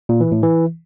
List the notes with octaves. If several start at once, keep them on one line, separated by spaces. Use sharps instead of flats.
A#2
E3
A2
E3